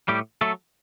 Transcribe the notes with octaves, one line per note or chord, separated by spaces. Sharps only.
A2 G3 G4
F#3 A3 A4